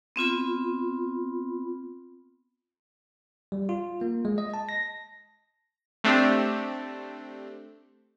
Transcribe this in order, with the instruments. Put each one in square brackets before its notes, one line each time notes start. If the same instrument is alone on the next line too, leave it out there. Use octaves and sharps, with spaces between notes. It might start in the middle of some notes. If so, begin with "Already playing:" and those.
[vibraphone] B3 C4 F4 B5
[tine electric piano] G3
F4
A#3
G#3
D#5
A5
A#6
[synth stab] A3 C4 D4 G4